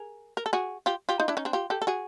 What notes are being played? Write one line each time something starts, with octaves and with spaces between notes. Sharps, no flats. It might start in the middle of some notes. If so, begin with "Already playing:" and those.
Already playing: G#4 A#4
A#4
A4
F#4 G#4
F4 G4
F4 G4
D#4 F4
D4 E4
C#4 D#4
C4 D4
F4 G4
G4 A4
A4
F#4 G#4